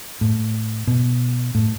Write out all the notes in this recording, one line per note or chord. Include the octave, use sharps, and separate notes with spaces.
A2
B2
A2